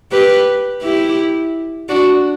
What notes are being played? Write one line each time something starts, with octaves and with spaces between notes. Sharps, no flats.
G4 B4
E4 G4
D4 F#4